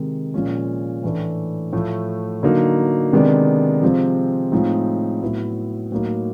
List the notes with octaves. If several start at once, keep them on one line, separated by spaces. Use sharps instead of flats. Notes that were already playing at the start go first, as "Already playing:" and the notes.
Already playing: C3 D#3 G#3
A#2 F3 G#3 C#4
A2 E3 A3 D4
A2 F3 A3
D3 F#3 A#3 D#4
C3 D#3 G#3 B3 D4
C3 F3 G#3 C4
A2 F3 G#3 C4 D#4
A2 F#3 B3 E4
A2 F#3 A#3 D#4